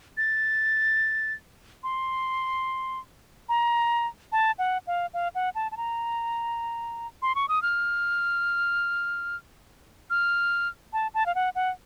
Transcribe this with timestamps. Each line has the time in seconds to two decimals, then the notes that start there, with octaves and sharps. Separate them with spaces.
0.17 A6
1.83 C6
3.49 A#5
4.32 A5
4.59 F#5
4.87 F5
5.14 F5
5.35 F#5
5.55 A5
5.72 A5
5.77 A#5
7.22 C6
7.35 C#6
7.49 D#6
7.62 F6
10.10 F6
10.93 A5
11.14 A5
11.26 F5
11.35 F#5
11.55 F#5